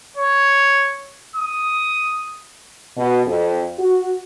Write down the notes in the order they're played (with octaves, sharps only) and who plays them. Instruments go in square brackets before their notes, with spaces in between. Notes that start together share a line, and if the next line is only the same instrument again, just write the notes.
[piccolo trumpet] C#5
D#6
[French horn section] B2
F2
F#4